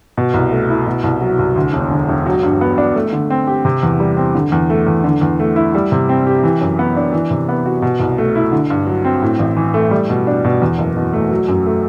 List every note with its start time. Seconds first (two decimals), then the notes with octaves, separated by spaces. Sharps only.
0.18 B2
0.34 C2
0.51 A3
0.69 E4
0.87 B2
1.04 C2
1.21 F#3
1.39 C2
1.56 D2
1.73 E1
1.91 D3
2.09 E1
2.26 F#3
2.43 G2
2.61 B3
2.78 D4
2.95 A3
3.13 D3
3.30 C4
3.47 G4
3.65 C3
3.83 E2
4.00 G3
4.17 C4
4.35 D3
4.52 E2
4.70 A3
4.87 E2
5.04 D3
5.21 E2
5.40 A3
5.56 E4
5.75 G3
5.92 C3
6.09 C4
6.27 G4
6.44 E3
6.61 F#2
6.79 B3
6.96 D4
7.13 E3
7.31 C3
7.49 B3
7.66 F#4
7.82 B2
8.00 C2
8.18 A3
8.35 E4
8.52 D3
8.70 G2
8.87 F#3
9.05 C4
9.22 A2
9.39 A1
9.57 E3
9.74 A3
9.91 G3
10.10 B2
10.27 D4
10.45 B2
10.62 E2
10.78 F#1
10.97 B2
11.13 A3
11.31 F#3
11.48 F#2
11.66 A3